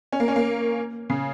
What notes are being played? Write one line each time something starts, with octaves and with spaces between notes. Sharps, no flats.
C#4
A#3
C#4
A#3
C#3